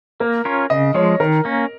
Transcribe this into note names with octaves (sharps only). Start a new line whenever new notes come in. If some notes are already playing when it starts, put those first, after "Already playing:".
A#3 A#4
C#4 F4 A#4 C#5
C#3 D#5
F3 G#3 C#5
D#3 A#4
A#3 C#4